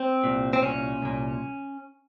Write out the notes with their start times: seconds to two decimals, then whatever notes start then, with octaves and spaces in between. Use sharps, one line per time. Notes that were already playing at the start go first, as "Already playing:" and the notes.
Already playing: C4
0.24 C2 A#2
0.53 C4
0.63 C2 A#2 C#4
1.02 C2 A#2